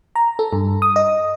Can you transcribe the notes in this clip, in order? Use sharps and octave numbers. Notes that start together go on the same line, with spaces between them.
A#5
A4
G2
D#6
D#5